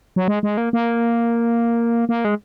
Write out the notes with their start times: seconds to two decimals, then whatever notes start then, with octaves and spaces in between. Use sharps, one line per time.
0.16 F#3
0.28 G#3
0.43 G#3
0.57 A#3
0.73 A#3
2.09 A#3
2.25 G#3